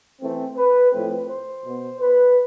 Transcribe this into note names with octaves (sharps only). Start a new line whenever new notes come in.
E3 A3 C4
B4
A2 F3 A3 C4 B4
C5
B2 B3
B4